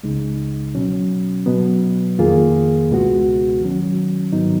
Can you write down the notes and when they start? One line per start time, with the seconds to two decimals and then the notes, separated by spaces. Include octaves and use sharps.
0.03 C#2 C#3 G#3 D#4
0.75 B2 F#3 C#4
1.46 B2 F#3 B3
2.19 F2 D#3 A#3 F4 G#4
2.89 C#2 B2 G#3 B3 F#4
3.61 D#3 F#3 C#4
4.32 G#2 D#3 F#3 B3 D#4